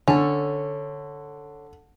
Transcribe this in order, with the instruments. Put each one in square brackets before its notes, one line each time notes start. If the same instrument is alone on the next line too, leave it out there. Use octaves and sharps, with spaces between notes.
[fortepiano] D3 [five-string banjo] C#4 A4